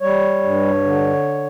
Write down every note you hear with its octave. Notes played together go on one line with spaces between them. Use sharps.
G3 C#5
G2
D3